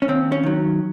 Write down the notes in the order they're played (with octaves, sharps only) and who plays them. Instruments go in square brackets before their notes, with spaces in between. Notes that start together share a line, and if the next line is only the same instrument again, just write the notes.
[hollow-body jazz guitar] C#4
D#2 C4
C#4
D#3 F#3